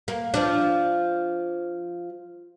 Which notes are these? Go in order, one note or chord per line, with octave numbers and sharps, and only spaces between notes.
A#3
F3 D4